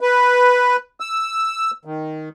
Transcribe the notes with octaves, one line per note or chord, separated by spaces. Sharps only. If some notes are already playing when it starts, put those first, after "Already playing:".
B4
E6
D#3